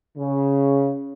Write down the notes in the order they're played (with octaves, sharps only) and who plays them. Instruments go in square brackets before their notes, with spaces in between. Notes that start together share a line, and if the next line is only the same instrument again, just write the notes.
[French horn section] C#3